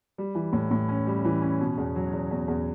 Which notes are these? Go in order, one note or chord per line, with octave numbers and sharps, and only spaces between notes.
G3
E3
A2
A2
C#4
G3
E3
C#4
B2
E2
F#3
E2
E2
E2